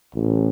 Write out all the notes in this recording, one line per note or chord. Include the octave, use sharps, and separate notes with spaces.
A1